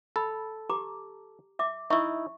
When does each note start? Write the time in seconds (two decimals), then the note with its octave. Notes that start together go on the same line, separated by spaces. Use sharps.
0.16 A4 B5
0.69 G4 A#5 D6
1.59 E5 D6
1.90 D#4 E4 E5 C#6